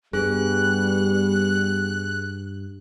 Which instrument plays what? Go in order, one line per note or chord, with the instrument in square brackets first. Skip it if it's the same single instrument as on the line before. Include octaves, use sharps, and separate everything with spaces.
[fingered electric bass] G2 [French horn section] G3 B3 [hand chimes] G#4 [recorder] F#6